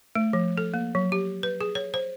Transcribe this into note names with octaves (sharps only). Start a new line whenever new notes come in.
A3
F3
A4
A#3
F#3
G4
B4
G#4
C#5
C5